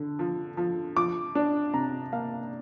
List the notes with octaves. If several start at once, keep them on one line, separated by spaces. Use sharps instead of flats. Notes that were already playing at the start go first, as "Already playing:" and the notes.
Already playing: D3
F3
F3
F3 D6
D4
C3 A#5
A#3 F5